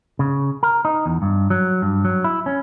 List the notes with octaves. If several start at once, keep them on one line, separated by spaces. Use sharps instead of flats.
C#3
A#4
D#4
E2
G2
F#3
G2
F#3
E4
C#4